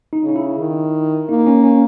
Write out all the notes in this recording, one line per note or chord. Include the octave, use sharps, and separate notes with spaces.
D#4
C#3
D#4
E4
D#3
A#3 D#4
C#4
C#4